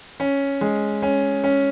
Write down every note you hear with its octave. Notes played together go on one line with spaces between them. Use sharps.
C#4
G#3
C#4
C#4